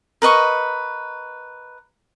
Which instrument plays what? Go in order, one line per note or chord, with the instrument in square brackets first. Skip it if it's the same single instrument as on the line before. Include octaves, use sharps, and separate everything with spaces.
[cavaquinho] A#4 B4 D#5 C#6